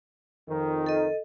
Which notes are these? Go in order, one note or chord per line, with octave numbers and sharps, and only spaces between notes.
F2 D#3
A4 D#5